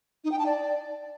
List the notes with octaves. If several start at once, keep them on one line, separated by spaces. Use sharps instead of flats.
D#4
G5
A5
D5